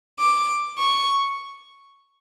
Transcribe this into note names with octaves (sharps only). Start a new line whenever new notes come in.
D6
C#6